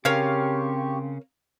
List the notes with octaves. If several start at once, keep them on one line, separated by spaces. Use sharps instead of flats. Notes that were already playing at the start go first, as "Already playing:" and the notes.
C#3 C4 G4 A#4 C#5 F5 C#6